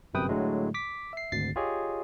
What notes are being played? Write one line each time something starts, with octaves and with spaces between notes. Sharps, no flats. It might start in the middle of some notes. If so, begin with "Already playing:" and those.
G1 F#2 C3 B4 G5 D#6
A2 D3 F#3 G#3 A3
D6 B6
E5 C7
G#1 D2 A6 C7
F4 G4 G#4 C#5 D#5